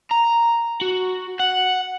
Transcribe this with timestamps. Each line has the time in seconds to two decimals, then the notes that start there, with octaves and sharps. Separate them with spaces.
0.11 A#5
0.81 F#4
1.39 F#5